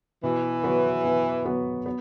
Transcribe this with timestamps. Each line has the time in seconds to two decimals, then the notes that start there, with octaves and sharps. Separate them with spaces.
0.23 B2 E3
0.63 F#3 B3 F#4 B4
1.04 B2
1.45 F#3 B3 F#4 B4
1.86 B3